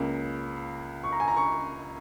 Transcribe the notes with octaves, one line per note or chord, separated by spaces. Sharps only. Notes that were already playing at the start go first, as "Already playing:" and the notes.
Already playing: C#2 C#3 A#3
C#6
A#5
G#5
A#5
C#6